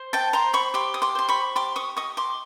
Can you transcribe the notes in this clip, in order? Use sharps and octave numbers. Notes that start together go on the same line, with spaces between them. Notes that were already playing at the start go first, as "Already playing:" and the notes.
Already playing: C5
G5 A5
C5 A#5 C6
B5 C#6
G4 C6 D6
D#6
C6 D6
C5 C6
B5 C#6
G4 C6 D6
C#6 D#6
D#5 C#6 D#6
C6 D6